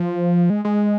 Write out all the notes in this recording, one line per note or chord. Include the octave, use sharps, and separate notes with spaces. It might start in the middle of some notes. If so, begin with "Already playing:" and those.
Already playing: F3
G#3
G#3